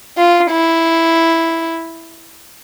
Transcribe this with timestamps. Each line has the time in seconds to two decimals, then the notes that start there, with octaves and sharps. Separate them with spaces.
0.17 F4
0.51 E4